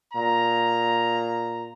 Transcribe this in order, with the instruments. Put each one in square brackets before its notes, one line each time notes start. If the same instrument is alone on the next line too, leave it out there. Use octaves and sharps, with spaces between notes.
[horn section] A#2 A#5